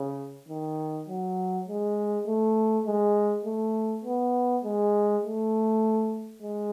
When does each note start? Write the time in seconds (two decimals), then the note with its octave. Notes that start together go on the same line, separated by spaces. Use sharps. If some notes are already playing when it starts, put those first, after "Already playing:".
Already playing: C#3
0.48 D#3
1.08 F#3
1.67 G#3
2.27 A3
2.86 G#3
3.45 A3
4.04 B3
4.64 G#3
5.23 A3
6.42 G#3